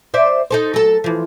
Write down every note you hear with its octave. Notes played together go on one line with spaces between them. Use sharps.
C5 D5 E5
D#4 A4 C5
F#3 A4
E3 F3